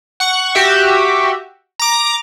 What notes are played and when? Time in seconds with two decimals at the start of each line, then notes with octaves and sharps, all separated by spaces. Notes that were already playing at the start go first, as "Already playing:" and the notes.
0.20 F#5 C#6
0.55 F#4 G4 E5
1.79 A#5 D6